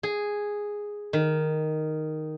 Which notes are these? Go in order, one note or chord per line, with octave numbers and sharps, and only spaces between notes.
G#4
D#3